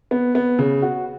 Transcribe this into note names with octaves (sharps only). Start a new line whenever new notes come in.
B3
B3
C#3
F#4